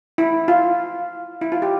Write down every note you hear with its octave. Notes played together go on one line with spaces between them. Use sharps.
E4
F4
E4
F4
G4